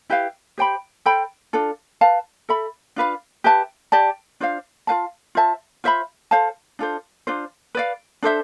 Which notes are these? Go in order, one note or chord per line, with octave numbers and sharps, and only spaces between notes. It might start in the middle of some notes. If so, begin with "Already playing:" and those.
E4 G4 B4 F5
G4 C5 G5 B5
A4 C5 G5 B5
D4 F4 A4
B4 F5 A5
A4 E5 B5
D4 F4 B4 F5
G4 B4 E5 A5
G4 D5 A5
D4 F4 C5 F5
F4 B4 F5 A5
F4 C5 E5 A5
F4 C5 E5 B5
A4 C5 F5 A5
D4 F4 A4 C5
D4 F4 C5
B4 D5 F5
D4 A4 C5 E5